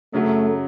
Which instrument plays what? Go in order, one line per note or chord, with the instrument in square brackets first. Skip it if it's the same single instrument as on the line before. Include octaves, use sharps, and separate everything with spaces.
[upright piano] F#2 C#3 F#3 [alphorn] A3